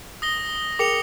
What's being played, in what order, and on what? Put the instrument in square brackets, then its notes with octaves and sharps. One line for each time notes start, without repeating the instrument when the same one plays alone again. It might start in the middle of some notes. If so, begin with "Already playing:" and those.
[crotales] D#6 A#6 G7
[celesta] G#4 A#4 G5 [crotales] D6 C#7 F7